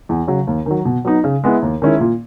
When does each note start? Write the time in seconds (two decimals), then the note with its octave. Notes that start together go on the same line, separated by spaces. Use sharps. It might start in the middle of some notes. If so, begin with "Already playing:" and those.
0.09 E2
0.27 C#3 F#3
0.47 D#2
0.66 D#3 F#3
0.85 B2
1.05 F#3 B3 D#4
1.24 C#3
1.44 G#3 B3 E4
1.62 D#2
1.82 D#3 G#3 C#4 E4
2.00 A#2